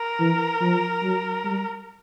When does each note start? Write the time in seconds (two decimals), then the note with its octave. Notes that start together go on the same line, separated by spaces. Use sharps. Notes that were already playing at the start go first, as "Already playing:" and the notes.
Already playing: A#4
0.20 E3
0.62 F3
1.03 F#3
1.45 G3